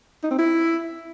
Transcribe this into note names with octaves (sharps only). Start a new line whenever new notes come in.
D#4
C4
E4